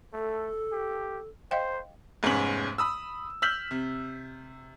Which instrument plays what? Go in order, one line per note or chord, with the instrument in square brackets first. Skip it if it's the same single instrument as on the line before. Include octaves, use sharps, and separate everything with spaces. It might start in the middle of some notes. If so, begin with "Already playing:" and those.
[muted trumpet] A3 [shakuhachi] A4
[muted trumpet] G4
[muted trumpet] C5 [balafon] D#5 F5 G5
[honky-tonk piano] F1 G#2 B3 C#4 F#7
B5 D#6 E6
E6 F6 G6 B6 F#7
C3